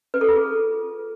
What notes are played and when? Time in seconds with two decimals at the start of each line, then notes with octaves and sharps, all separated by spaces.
0.14 B4
0.21 A4
0.29 F4
0.36 G#4